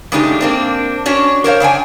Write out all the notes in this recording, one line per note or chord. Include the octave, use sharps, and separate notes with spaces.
C#3 G#3 A3 D4 D#4 G4
A#3 C4 D4
C#4 D4 F#4 C#5
A#4 C5 C#5 F5
C#3 D4 G5 G#5